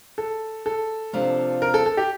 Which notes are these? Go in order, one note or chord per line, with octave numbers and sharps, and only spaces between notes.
A4
A4
C3 F3 A#3 D4 F4
A#4
A4
A4
G4